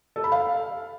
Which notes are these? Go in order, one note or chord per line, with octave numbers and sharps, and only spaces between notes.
A4
B5
F5